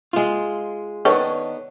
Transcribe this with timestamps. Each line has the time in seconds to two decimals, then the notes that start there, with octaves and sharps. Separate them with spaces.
0.13 G#3 F4
1.05 D#3 B3 C#4 D4 A4 C#5